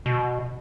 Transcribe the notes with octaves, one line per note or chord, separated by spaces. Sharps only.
B2